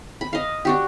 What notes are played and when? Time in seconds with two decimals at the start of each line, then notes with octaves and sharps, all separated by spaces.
0.21 B5
0.33 D#5 F5
0.65 D4 F#4 G4